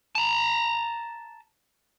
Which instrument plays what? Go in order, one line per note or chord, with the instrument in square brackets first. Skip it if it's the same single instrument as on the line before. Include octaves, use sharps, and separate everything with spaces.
[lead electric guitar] A5 A#5